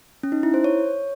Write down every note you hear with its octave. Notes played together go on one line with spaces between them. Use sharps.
C#4
D#4
E4
C5
C#5